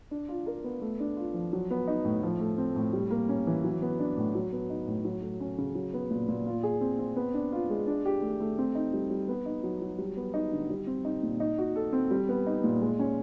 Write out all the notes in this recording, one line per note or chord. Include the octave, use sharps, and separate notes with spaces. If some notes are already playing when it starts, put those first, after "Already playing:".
D4
F4
A#4
B3
A3
D4
F4
F3
F#3
B3
D#4
A2
F3
A3
C4
A2
G3
A#3
C#4
E3
F#3
B3
D4
A2
F#3
B3
D#4
A2
F#3
A3
C#4
C#3
F#3
B3
A#2
A#2
F4
G#4
C4
C4
B3
D4
F4
G#3
D4
G4
A3
A3
C4
D#4
G3
G3
B3
D#4
F#3
F#3
G3
B3
D#4
D3
G3
C4
D#4
A#2
D#4
F#4
A4
C4
G3
B3
D#4
A#2
G#3
C#4